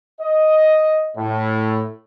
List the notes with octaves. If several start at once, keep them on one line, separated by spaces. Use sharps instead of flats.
D#5
A2